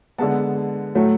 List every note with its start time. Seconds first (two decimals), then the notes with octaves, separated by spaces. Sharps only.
0.18 D3 G#3 B3 A5
0.95 A2 F#3 A3